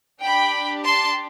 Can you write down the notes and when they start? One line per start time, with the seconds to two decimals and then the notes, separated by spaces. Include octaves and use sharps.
0.23 D4 G4 G5 B5
0.85 A5 C6